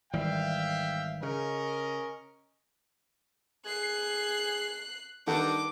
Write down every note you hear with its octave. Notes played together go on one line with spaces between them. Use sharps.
G#1 E3 G3 E5 F5 G5
C#3 C#4 A#4 D#5
G#4 F#6 C7
G2 D#3 A4 F#5 D6